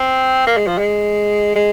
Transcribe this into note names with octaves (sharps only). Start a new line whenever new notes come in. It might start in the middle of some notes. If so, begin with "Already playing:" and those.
Already playing: C4
A#3
G#3
F3
G#3
G#3